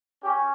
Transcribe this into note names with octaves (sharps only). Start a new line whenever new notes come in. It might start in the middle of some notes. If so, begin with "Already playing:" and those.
C#4 G4